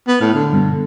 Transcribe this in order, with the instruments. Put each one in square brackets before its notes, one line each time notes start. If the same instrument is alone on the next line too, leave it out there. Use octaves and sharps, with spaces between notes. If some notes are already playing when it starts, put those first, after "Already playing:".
[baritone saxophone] B3
[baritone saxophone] A2 [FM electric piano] F6
[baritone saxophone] D3
[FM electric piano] G2 B2